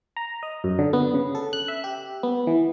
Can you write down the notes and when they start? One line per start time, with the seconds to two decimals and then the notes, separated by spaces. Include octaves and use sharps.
0.17 A#5
0.43 D#5
0.64 F#2
0.79 D3
0.93 B3
1.14 C#3
1.35 A4
1.53 F#6
1.68 E5
1.84 G4
2.23 B3
2.47 E3